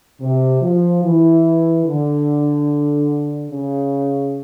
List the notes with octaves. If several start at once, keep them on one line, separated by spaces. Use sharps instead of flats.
C3
F3
E3
D3
C#3